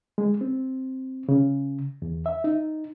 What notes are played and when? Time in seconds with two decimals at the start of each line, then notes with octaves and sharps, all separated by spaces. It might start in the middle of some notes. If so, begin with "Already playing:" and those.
0.18 G#3
0.41 C4
1.29 C#3
2.02 E2
2.26 E5
2.44 D#4